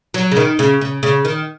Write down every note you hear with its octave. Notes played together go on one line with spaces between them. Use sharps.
F#3
C#3
D#3
C#3
C#3
C#3
D#3